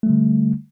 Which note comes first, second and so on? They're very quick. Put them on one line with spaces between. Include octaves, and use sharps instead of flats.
A3 G3 D3